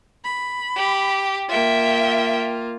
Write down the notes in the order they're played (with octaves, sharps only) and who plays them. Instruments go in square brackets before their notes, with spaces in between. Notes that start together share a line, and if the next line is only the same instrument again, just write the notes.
[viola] B5
[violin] G4
[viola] A#3 F4 [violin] E5 G5